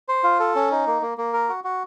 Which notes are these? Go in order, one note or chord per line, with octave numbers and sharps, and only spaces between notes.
C5
F4
A4
C#4
D#4
A#3
A#3
A#3
A#4
F#4
F#4